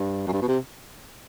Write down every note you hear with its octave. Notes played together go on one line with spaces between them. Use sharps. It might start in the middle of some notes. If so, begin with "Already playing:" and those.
Already playing: G2
F#2
G2
B2
C3